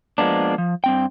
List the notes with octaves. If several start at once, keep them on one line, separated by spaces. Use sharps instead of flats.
F3 G#3 A#3 B3 D4
F3
G2 C4 G5